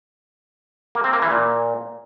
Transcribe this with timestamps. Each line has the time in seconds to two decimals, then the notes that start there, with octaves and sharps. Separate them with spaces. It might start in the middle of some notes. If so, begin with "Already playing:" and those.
0.95 A#3
1.04 C4
1.13 A#3
1.22 E3
1.31 A#2